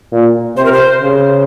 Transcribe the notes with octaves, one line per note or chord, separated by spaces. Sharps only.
A#2
C3 C5
A#4
C5
C#3